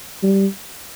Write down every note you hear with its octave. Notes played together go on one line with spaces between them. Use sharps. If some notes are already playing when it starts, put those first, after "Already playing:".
G3